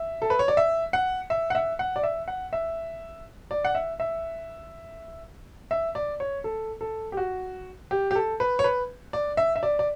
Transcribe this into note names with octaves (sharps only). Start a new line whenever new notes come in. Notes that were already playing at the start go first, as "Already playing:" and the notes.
Already playing: E5
A4
B4
C#5
D5
E5
F#5
E5
F#5
E5
F#5
D5
E5
F#5
E5
D5
F#5
E5
E5
E5
D5
C#5
A4
A4
G4
F#4
G4
G4
A4
B4
C#5
B4
D5
E5
E5
D5
D5